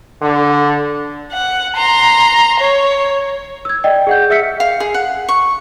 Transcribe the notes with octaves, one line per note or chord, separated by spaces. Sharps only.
D3
F#5
A#5 C6
C#5
E6 G#6
D5 D#5 G5
G#4 F#5 G6
G#4 E5 E6 F6 B6 C#7
F5
G#4
F#5
C#6